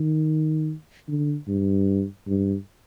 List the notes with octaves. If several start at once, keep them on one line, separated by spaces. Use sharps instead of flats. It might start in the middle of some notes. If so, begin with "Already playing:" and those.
Already playing: D#3
D3
G2
G2